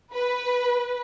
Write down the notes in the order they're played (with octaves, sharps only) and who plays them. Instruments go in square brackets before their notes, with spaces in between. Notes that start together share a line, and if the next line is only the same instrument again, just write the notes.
[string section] B4